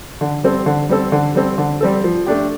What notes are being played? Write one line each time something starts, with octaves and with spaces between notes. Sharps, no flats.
D3
G3 C4 A4
D3
G3 C4 A4
D3
G3 C4 A4
D3
G3 C4 A4
F3
A3 D4 G4